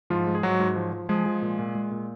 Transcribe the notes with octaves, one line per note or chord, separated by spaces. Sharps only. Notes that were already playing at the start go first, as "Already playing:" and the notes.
G#2 F3 F4
G#3
G#4
G#2 F#3 F#4
G#2
F3
F3
F3 G#3 G#4
F3
A#2
A#2
G#3
A#2